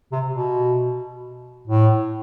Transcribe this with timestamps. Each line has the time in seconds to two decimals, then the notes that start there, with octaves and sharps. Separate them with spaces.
0.12 C3
0.34 B2
1.68 A2